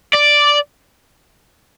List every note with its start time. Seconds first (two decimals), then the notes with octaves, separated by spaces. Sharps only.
0.14 D5